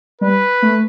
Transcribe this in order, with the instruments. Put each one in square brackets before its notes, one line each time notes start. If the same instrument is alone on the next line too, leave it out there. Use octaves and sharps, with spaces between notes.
[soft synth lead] G3 [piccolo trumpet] B4
[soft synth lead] A3